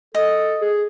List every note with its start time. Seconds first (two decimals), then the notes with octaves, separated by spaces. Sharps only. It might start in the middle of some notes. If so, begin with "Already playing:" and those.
0.15 A4 D#5
0.61 G#4